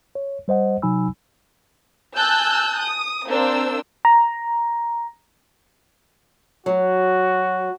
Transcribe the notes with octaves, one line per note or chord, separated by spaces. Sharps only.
C#5
G3 C5 D#5 F#5
C3 F#3 D#4 G#5 B5 E6
G#5 A5 E6 F#6 G6
D#6
A#3 C4 D4 C5 E6
A#5
F#3 F#4